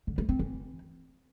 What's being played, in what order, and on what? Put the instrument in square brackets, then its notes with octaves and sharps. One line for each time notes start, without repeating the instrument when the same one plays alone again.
[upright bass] D3
A3
C4
E3